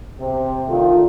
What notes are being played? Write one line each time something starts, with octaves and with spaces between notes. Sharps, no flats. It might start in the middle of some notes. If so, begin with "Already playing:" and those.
C3
D#3 A3 D4 F4